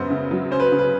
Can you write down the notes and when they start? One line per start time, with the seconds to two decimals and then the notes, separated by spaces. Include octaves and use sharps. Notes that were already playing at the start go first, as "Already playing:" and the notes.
Already playing: F#2 C#3 B3 C5
0.10 C#3
0.31 F#3
0.51 C#4 C5
0.59 B4
0.72 C#3
0.79 B4